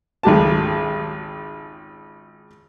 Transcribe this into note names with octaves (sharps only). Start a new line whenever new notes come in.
G#1 C#2 G4 A5